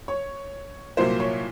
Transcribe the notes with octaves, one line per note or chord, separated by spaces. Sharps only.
C#5
C2 A#2 F#3 A#3 C5
C#5